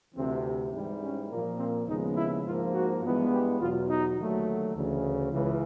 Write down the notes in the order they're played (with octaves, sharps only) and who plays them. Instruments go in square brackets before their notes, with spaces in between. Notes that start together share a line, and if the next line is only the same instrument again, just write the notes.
[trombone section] D2 C3 E3 C4
G#2 E3 G3
C#4
A#2 F3 A#3
C4
D#2 C#3 F3 G#3 B3 D#4
E4
G#2 F3 A#3 F4
F#4
G2 E3 G#3 B3
G4
E2 B2 F#3 F4
D#4
D#2 D3 F#3 A3
D2 C#3 E3
C#2 C#3 E3